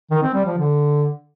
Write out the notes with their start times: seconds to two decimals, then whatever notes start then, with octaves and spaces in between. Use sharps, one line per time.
0.11 D#3
0.23 C4
0.34 G3
0.46 F3
0.58 D3